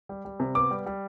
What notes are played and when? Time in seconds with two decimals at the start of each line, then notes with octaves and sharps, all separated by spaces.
0.09 G3
0.25 G3
0.40 C3
0.55 B3 D6
0.71 G3
0.86 G3